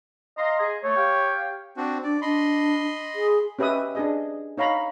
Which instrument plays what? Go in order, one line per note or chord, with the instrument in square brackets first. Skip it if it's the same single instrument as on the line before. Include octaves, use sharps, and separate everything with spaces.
[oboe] D#5 [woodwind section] F5 A#5 C6
[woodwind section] G#4
[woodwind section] A3 [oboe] C#5
[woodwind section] G4 F5 G5
[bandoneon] C4 D4 F#4
[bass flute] D4 [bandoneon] D5
[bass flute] D4 [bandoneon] D#5 B5 C6
[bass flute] G#4
[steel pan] C#4 G4 B4 D#5 E5 D#6
D4 G#4 D#5
D#4 C#5 F5 A#5 B5